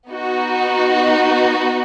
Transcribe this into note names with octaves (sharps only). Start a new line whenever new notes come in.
B3 D#4 F#4